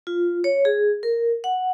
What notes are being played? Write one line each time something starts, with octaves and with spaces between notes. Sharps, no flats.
F4
C#5
G#4
A#4
F#5